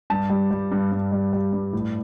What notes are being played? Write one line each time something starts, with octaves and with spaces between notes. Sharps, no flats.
G2 A5
G3
G3
G2
G2
G3
G3
G2
A2